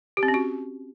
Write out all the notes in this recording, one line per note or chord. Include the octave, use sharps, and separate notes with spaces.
G4
C4
C#4
F#4